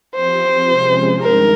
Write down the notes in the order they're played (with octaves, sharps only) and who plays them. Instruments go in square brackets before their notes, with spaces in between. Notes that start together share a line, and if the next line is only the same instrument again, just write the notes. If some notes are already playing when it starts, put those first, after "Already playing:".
[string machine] F3 C4 G4 [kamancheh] C5
[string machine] C3 F3 G#3 C#4 G#4
[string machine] G2 D#3 G#3 D#4 [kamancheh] A#4